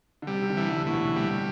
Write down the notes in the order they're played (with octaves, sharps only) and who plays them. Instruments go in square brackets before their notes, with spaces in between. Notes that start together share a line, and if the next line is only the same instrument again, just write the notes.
[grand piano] D3
[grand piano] C3 [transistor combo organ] G3
[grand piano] C3
D3
[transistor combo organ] E3
[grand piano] D3
[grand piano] A2 [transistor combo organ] E3
[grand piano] B2
[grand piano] A2 [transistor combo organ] G3